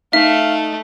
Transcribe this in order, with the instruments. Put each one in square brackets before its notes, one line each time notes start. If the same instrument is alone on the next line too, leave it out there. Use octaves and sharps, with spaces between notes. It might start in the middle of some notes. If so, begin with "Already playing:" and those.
[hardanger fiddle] A3 [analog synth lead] D#4 [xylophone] E5 [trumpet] F5